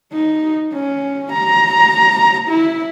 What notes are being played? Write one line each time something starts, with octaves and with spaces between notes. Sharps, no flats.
D#4
C#4
A#5
E4